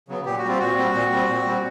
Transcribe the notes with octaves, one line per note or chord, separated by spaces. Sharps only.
C#3 F#3 B3
A#2 G4
F#4
G3 C4 F4
A#2 F#4
G3 C4
A#2
G3 C4
A#2
G3 C4